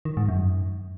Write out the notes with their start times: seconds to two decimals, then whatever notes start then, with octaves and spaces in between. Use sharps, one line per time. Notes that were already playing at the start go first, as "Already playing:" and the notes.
0.05 D#3
0.17 G#2
0.28 F#2